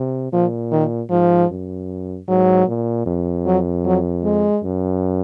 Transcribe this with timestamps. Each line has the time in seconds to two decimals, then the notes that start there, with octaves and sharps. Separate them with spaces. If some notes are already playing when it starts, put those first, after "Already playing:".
Already playing: C3
0.33 A#2 F3
0.72 D#3
1.10 G#2 F3
1.50 F#2
2.28 G#2 F#3
2.67 A#2
3.06 F2
3.46 F#3
3.85 F#3
4.24 G#3
4.64 F#2